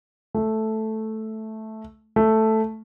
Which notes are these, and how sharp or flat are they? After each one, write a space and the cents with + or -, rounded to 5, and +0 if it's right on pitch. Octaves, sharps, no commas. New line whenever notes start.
A3 -5
A3 +0